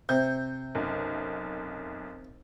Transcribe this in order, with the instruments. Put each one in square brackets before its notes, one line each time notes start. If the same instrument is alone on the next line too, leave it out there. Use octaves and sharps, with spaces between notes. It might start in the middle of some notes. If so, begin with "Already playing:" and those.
[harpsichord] C3 [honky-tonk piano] G6
[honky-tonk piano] B1 F#2